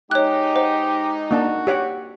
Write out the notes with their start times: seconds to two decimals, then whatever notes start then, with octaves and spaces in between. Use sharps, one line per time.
0.11 G#3 D#4 G4 C#5 F#6
0.56 C5 F#5
1.31 A#3 D4 F#4 A5
1.67 G4 C#5 F#5